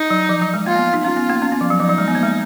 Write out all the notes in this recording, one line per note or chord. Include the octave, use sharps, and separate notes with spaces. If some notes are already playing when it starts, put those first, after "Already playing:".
Already playing: D#4
F#3
F3
F#3
G#3
A#3 F4
B3
D#4
C#4 F4
B3
A#3
C#4
B3
F3
F#3
F3 D#4
F#3
G#3
B3
A#3
G#3